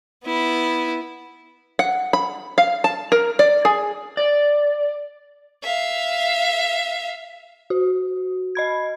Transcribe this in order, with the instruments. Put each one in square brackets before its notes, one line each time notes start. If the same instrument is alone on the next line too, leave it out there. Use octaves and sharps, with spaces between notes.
[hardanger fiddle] B3 E4
[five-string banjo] F#5
B5
F5
A5
A#4
D5
G#4
[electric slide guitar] D5
[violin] E5 F5
[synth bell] F#4
D#5 B5 G#6